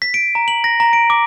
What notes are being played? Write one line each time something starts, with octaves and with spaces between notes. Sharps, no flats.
B6
D7
A#5
F#7
A#6
A#5
D7
D6